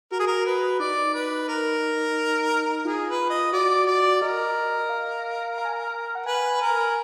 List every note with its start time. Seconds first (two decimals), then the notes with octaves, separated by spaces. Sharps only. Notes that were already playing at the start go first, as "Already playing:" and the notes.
0.11 F#4 A#4
0.19 G#4
0.27 A#4
0.46 B4
0.80 D#4 D5
1.14 B4
1.48 A#4
2.85 F4 G#4
3.08 B4
3.30 D#5
3.53 F#4 D5
3.87 D5
4.21 A#4 D#5
4.90 F5
5.58 A#5
5.65 G#5
5.73 A#5
6.15 F#5
6.26 B4 G#5
6.61 A#4